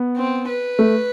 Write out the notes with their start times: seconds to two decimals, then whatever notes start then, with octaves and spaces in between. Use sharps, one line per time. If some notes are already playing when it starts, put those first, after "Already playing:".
Already playing: B3
0.17 C4
0.48 B4
0.79 A3